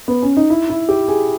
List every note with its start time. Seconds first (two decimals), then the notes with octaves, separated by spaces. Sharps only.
0.08 B3
0.22 C#4
0.37 D#4
0.50 E4
0.70 E4
0.89 G4
1.08 G#4